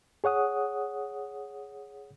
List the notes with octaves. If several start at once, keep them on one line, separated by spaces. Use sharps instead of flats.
G#4 C#5 F#5 D#6